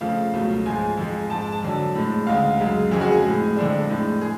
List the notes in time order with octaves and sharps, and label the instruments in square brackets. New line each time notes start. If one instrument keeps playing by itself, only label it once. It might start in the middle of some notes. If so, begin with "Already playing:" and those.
[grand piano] F2 C#3 F3 A3 F5
C#2 B2 F#3 A3
G#2 F3 G#3 G#5
F2 F3 G#3
G#2 A5
G#3
A5
A5
F2 D3 F#3
A2 G#3
D2 C#3 G#3 F5
F#2 C#3 G#3
F2 C#3 G#3 G#4
F#4
G#4
A2 G#3
F2 D3 G#3 D4
A2 G#3
G#3 G#4